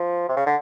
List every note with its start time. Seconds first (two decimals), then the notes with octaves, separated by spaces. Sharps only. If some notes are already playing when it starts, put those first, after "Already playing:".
Already playing: F3
0.29 C3
0.37 C#3
0.47 D3